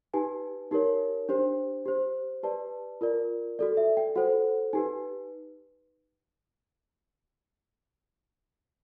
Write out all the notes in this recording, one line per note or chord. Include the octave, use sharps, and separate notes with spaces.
D#4 G4 B4 G#5
D#4 G4 A#4 C#5
D4 G4 C5
G4 C5
G4 B4 D5 A5
F4 A#4 D5
F#4 A4 D5
E5
G5
F#4 A4 C5 F#5
D#4 G4 B4 G#5